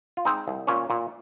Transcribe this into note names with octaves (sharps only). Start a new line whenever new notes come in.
F4
G#3 C4 D#4
C2
A#2 C#4
A#2